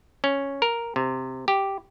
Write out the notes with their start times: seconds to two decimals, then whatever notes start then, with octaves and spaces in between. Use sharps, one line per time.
0.24 C#4
0.62 A#4
0.96 C3
1.48 G4